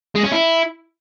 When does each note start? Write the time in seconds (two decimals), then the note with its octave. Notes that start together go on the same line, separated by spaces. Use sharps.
0.15 G#3
0.24 C#4
0.32 E4